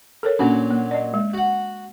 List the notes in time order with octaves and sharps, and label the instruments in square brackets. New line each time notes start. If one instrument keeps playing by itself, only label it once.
[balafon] A4 A#4 C#5
[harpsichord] A#2 F#3 [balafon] C#4 D4
[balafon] A#3
D5 D#5
G#3
[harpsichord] F#4 F#5